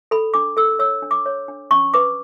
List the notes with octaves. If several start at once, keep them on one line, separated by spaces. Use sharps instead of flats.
A4 B5
D4 D6
A4 E6
C#5 E6
D4
D6
C#5
D4
C#4 C#6
B4 D6